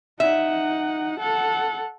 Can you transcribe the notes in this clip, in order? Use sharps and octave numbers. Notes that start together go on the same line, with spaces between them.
D#4 E5 F#5
A4 F#5